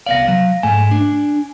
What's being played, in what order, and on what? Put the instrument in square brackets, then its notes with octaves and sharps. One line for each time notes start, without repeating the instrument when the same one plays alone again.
[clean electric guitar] C2 B3 D5 [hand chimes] F5 A#6
[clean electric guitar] F#3
[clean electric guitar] G#2 A3 [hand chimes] G#5
[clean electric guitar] D4